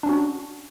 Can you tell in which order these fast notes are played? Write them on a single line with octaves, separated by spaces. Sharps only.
D4 C#4 F#4